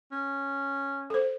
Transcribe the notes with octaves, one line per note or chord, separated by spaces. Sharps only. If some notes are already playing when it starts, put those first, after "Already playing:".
C#4
A4 C5